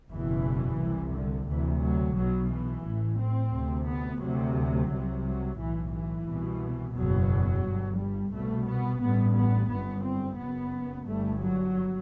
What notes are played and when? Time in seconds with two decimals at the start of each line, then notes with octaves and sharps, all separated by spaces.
0.10 F#1 E2 B2 E3
0.79 C2 C3
1.14 D3
1.48 D2 C3 E3
1.82 F#3
2.16 B1 B2 F#3
2.51 E3
2.85 A1 A2
3.19 C4
3.53 D2 C3
3.87 B3
4.21 D2 C3 F#3
4.90 C2 C3
5.24 F#3
5.58 B1 A2 E3
5.93 E3
6.27 C2 B2
6.96 F#1 E2 B2 F#3
7.64 G1 G2
7.98 G3
8.32 C2 B2 A3
8.66 B3
9.01 A1 G2 B3
9.35 B3
9.69 G1 F#2 B3
10.04 C4
10.37 F#1 F#2 B3
11.06 G1 G2 A3
11.40 F#3